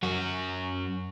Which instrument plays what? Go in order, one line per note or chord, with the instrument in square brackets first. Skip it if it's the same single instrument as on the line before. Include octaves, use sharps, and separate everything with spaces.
[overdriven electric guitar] F#2 F#4